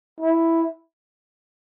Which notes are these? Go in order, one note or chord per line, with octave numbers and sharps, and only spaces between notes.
E4